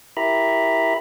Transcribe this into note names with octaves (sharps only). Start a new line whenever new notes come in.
E4 G4 A#4 E5 A#5 B5